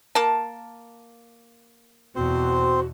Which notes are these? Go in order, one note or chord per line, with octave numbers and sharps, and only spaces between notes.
A#3 A5
E2 B2 C4 F#4 C5